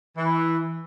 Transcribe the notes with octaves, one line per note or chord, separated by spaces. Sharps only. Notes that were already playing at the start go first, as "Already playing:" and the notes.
E3